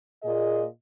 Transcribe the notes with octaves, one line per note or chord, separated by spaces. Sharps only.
A#2 G#4 D#5